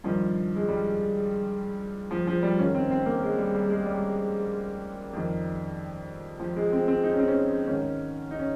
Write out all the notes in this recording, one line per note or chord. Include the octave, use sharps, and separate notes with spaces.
G2 D#3 F3
G#3
G3
F3
F3
G3
G#2 D#3 C#4
C4
C4
A#3
G#3
G3
G3
G#3
G3
F2 D#3
F3
G#3
C4
C4
D#4
C#4
C4
C#4
G#2 D#3 C#4
D#4
C#4